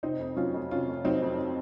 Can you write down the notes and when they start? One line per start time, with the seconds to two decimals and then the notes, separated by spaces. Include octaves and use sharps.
0.03 C3 C4 D#4
0.20 F2
0.36 F#3 C#4 F4
0.54 F2
0.71 C3 C#4 F4
0.88 F2
1.04 F#3 C4 D#4
1.22 F2